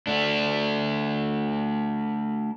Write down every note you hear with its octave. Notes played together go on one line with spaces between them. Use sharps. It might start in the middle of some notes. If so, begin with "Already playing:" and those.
A3 D4